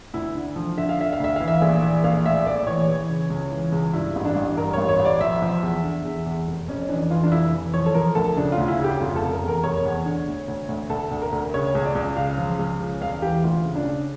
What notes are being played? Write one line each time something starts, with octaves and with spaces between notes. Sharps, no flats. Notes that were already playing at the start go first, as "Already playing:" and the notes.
D2 E4
D3
F3
D3 E5
F5
D3 E5
F5
D2 E5
E3 F5
E5
A#1
E3
A#1 F5
A2 E5
A#1 D5
E3 C#5
E3
C#3
C#2
E3
C#2
G2 E4
A1
D4
A1
G2 A#4
A1 C#5
C#5
A1
D5
F3 E5
F3
E2
D3
E2
E2
F1
F2 C#4
E3 D4
E3 F4
D4
F1 E4
E3
F3 C#5
A4
F3 A#4
D2 A4
C#3 D4
F4
D2
E4
C#3
G4
F1 F4
A4
F1
A#4
E2
A#4
F1 C#5
E2
D3
D2
D2
D2
D2 A4
D2
A#4
D2
C#3 C#5
C#2
D5
C#2
C#3 F5
F3
C#2
C#3
E1 F5
E3 G4
D2 F4
C#3
D4
C#3